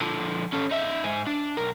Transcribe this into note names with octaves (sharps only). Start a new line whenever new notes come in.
D3 F3
C#4 A4
D#4 E5
G#2 G#4
D4
B1 A#4